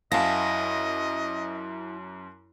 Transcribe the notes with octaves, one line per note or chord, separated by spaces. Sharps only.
F#2 E4 D#5 F5 F#5 G#5 A5 A#6